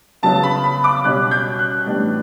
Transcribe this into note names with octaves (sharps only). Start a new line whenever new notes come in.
C#3 F#3 B3 A5
B5
B5
D6
B2 G3 C#4 F#6
G6
F#6
A2 E3 G3 B3 D4